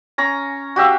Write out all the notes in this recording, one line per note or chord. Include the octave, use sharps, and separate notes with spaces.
C#4 A#5
F#4 G4 E5 F5